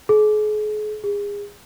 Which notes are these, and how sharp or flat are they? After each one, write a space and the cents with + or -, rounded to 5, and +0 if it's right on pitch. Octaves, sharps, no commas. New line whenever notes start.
G#4 +40
G#4 -30